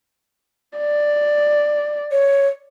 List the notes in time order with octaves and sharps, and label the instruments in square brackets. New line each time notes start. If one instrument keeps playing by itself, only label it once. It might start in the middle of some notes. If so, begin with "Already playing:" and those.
[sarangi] D5
[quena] C#5